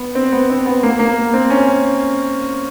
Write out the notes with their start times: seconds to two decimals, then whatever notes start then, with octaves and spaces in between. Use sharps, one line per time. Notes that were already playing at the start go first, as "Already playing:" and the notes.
Already playing: B3
0.15 C4
0.32 B3
0.50 C4
0.66 B3
0.83 A#3
0.99 A#3
1.34 C4
1.50 C#4